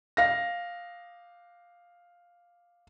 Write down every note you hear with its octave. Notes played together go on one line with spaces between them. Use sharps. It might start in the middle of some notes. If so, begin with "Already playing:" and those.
F5 A#6